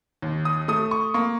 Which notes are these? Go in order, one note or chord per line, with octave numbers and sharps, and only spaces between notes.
D#2
D#6
A3 D#6
C#6
A#3 C#6